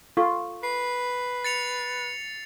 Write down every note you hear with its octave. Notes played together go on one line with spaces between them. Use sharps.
F4 A4 C#6
B4 C7
A6 C#7 F7